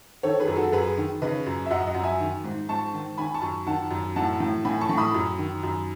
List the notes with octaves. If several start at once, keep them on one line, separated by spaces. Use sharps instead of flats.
D#3 A4 C#5
G#4 B4
F#2
F#4 A4
F#2 G#4 B4
D#3
C#3 B4 D#5
F#2
E5
F#2 D#5 F#5
D#5 F#5
F#2
E5 G#5
D#3
G#2
G#2 A5 C#6
D#3
D#3 G#5 B5
A5 C#6
F#2
D#3 F#5 A5
F#2
A2 F#5 A5
A2
A2 G#5 B5
A5 C#6
A2
B5 D#6
F#2
D#3
F#2